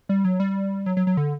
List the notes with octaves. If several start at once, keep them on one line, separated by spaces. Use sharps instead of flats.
G3
F#3
G3
F#3
F#3
F#3
D3